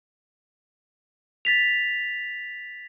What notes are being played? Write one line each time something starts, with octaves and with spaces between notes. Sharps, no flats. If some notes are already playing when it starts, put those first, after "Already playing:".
A6 B6 F7